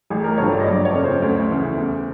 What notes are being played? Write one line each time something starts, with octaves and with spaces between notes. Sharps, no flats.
A1 G#4
A#4
G2 D3 F3 C#5
D5
D#5
F#1 D5
C#5
F2 C#3
C5
D2
C#3 E3
E2